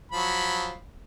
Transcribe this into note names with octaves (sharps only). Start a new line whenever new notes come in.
F3 F#3 B5